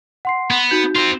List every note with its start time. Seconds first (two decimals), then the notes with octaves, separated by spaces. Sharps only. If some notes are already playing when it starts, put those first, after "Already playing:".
0.25 F#5 C6 C7
0.51 B3
0.71 D#4 F#4 G6
0.95 C4 F4